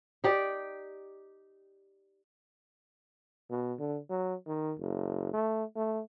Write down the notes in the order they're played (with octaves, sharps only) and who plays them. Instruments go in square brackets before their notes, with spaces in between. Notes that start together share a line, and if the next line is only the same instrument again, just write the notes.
[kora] D#4 G4 D5
[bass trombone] B2
D3
F#3
D#3
F#1
A3
A3